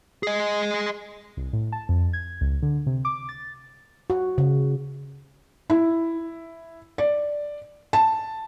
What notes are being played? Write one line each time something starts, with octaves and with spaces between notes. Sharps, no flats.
G#4 D#5
C2
A2
A5
F2
G#6
C#2
D3
C3
D6
A6
F#4
C#3
E4
D5
A5